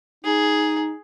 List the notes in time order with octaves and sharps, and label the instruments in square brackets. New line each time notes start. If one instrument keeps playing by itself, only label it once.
[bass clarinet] D#4 [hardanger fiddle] G#4